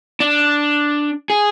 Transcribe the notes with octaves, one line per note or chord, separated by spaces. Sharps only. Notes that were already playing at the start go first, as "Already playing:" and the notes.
D4
G#4